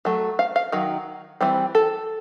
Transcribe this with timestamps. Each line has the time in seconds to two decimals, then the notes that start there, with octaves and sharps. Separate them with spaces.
0.05 F#3 A3
0.39 F5
0.56 F5
0.72 D#3 F#3
1.41 E3 G3 C4
1.75 A4